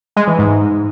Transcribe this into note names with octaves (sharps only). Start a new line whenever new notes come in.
G#3
E3
G#2